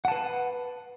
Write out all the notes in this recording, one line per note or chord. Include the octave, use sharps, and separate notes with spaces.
B4 F#5 A5